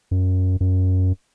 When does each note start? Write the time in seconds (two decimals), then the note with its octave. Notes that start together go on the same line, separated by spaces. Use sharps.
0.11 F#2
0.60 F#2